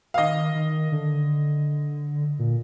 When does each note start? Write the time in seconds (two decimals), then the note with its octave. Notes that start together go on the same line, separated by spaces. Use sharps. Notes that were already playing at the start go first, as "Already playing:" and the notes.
0.14 F5
0.18 D#3 D#5
0.55 D#3
0.92 D3
2.39 A#2